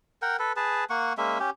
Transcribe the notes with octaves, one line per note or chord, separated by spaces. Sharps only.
A#4 F#5 G5
A4 B4
G#4 B4 A5
A#3 F#5 C#6
G#3 A#3 C#4 E5
C#4 G4